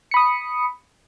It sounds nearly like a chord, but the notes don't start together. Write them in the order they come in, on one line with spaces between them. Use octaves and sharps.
C#7 B5 D#6